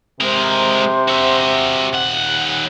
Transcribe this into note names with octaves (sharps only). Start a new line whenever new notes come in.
C3 G#3 A#4 C5
F#4 E5
D#2 F#5